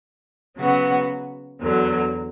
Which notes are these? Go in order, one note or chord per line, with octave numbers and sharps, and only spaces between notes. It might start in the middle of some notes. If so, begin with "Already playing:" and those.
C#3 F#3 B3 F#4
E2 D3 F#3